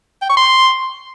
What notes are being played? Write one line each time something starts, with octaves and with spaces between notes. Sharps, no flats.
G5
C#6
C6